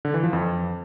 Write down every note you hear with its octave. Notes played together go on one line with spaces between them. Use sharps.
D3
E3
F3
F2